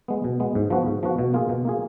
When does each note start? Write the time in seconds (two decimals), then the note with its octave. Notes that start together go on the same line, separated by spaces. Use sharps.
0.08 G#3 B3
0.24 B2
0.40 G#3 B3
0.55 G#2
0.70 F3 B3 F#4
0.87 G#2
1.03 F3 B3 F#4
1.19 B2
1.34 A#3 F4 G#4
1.49 B2
1.65 A#3 F4 G#4